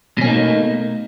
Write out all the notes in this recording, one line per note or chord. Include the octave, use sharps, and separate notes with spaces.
B2 A3 A#3 C#4 D#4